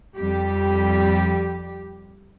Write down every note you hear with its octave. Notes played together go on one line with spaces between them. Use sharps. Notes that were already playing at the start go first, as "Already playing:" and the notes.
F2 G3 G4